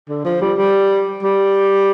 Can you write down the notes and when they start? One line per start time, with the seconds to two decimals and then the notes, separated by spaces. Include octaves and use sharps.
0.09 D3
0.25 F3
0.41 G3
0.57 G3
1.23 G3